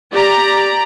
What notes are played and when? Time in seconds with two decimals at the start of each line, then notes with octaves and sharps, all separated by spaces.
0.12 G4 D5 A#5